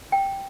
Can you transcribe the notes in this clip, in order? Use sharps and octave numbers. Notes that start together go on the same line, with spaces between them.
G5